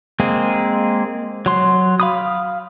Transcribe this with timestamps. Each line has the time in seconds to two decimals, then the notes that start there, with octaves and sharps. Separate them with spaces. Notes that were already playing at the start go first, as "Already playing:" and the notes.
0.20 G#3 A#3 C4 G#4
1.46 F#3 C6
2.00 F5 B5 D#6